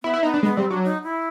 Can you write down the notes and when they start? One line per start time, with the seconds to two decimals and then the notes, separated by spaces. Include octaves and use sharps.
0.03 B3 E4
0.14 E4
0.23 B3 D#4
0.34 D4
0.43 G#3 B3
0.56 G3 C4
0.70 F#3 D4
0.84 D#4
1.03 E4